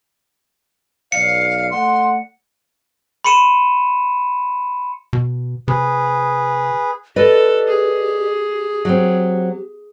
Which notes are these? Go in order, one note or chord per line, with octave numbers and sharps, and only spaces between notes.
B1 D5 F5 C#7
A3 D5 F#5 C6
B5 C6 C#7 D#7 E7
B2
C3 G#4 B4
G4 A4 B4 D5 D#5
G#4
F#3 C4